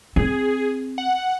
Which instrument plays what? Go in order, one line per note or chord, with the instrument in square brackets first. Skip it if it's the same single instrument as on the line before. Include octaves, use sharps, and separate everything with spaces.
[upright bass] C4 [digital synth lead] G#4
[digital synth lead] F#5